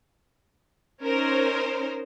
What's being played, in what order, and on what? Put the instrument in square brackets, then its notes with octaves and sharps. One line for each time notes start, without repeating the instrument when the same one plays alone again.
[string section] C#4 D#4 A#4 C5